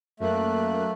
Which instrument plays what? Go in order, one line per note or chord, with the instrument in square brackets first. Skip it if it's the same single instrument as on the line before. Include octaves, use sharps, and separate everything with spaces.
[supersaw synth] F#2 A#3 F#6 [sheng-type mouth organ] A3